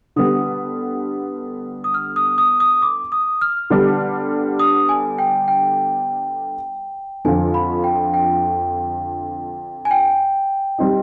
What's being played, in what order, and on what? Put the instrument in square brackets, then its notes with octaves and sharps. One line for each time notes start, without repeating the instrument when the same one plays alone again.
[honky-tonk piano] D3 G3 B3 [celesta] D#6
[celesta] D#6
F6
D#6
D#6
D#6
D6
D#6
F6
[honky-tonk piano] D3 G3 B3 D4
[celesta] D#6
G#5
G5
G5
[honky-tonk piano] F2 D3 F3 [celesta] G#5
[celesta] B5
G5
G5
G#5
G5
[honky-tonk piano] G3 C4 D#4